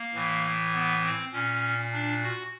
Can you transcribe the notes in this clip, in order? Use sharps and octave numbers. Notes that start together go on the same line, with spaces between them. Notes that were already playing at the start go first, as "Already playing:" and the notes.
Already playing: A#3
A2 E3
B3
C4
A#2 C#4
D4
F#4